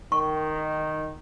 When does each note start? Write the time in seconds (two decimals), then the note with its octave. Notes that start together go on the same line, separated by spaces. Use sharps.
0.12 D#3 C#6